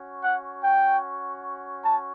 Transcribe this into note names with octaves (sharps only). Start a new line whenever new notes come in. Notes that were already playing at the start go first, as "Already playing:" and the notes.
Already playing: C#4 F#4
F#5
G5
A5